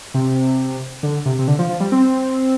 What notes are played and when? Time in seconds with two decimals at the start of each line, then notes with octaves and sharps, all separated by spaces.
0.14 C3
1.03 D3
1.26 C3
1.39 C3
1.48 D3
1.59 F3
1.69 F3
1.80 G3
1.92 C4